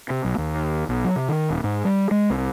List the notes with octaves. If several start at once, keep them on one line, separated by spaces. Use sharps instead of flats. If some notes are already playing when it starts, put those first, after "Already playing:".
C3
B1
D#2
B1
F#3
C3
D#3
D#1
G#2
G3
G#3
C2